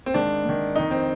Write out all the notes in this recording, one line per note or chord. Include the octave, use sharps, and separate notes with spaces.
C4
G#2 D#3 D4
G#2 D#3
F2 D#3 D#4
C4